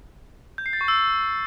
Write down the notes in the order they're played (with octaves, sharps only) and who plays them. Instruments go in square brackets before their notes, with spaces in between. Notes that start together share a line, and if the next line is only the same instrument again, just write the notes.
[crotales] G6
C7
A6
C#6
E6